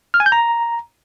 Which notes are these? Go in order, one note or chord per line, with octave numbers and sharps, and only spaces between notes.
F6
G#5
G6
A#5